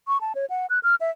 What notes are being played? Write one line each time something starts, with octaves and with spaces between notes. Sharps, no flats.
C#6
A5
C#5
F#5
F#6
F6
E5